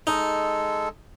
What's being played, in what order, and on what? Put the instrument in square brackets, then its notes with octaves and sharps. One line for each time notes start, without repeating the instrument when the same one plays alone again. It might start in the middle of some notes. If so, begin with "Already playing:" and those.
[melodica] G#3 A4 [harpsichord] D#4